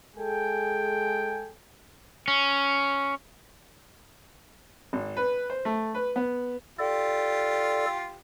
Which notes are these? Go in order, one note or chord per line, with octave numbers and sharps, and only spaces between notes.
G#3 G#4 A4 G5 G#5
C#4
G#1
B4
C5
A3
B4
B3
F4 G4 A4 D5